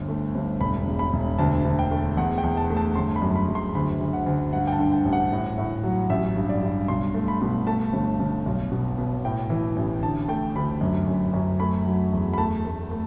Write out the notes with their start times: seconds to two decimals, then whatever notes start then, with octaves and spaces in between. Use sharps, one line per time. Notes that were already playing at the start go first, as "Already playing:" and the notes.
Already playing: G1 D2
0.08 A3
0.35 G1
0.60 E1 B5
0.87 E1
0.99 B5
1.13 E1
1.38 D2 A5
1.65 D2
1.79 G5
1.91 A3
2.17 E2 F#5
2.38 G5
2.43 E2
2.57 A5
2.70 A3
2.77 A5
2.95 G1 C6
3.16 B5
3.22 F#2
3.36 B5
3.48 F#2
3.55 C6
3.75 D2 B5
4.01 D2
4.13 F#5
4.26 D2
4.53 G2 F#5
4.67 G5
4.72 A5
4.79 D3
4.92 G5
5.05 A1
5.13 F#5
5.32 A2
5.58 A2
5.84 F#3
6.10 A1 E5
6.36 G2
6.49 D5
6.62 G2
6.88 B1 C6
7.14 A3
7.28 B5
7.42 B2
7.67 A3 A5
7.93 G1
8.20 G1
8.46 B1
8.72 B2
8.98 B2
9.25 A2 G5
9.50 E3
9.76 A1
10.03 D3 A5
10.28 A3 G5
10.56 D2 B5
10.81 F#2
11.08 F#2
11.34 F#2
11.60 A3 B5
11.86 F#3
12.12 E2
12.33 B5
12.38 A3 A5
12.65 A3
12.91 A3